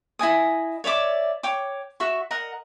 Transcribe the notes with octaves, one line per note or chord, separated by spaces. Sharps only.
E4 D#5 G#5 D#6
C#5 D5 E5 D6
C#5 G5 D6
F#4 E5 C#6
A#4 D#5 F#5